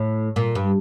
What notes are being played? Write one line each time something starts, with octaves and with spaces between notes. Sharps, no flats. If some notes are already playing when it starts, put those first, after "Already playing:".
Already playing: A2
A#2
G2